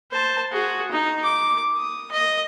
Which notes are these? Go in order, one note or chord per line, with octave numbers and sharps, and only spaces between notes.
C5 A5
F#4 G#4
D#4
D6
D#6
D#5